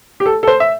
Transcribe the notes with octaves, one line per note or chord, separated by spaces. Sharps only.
G4
A4
A4
C5
E5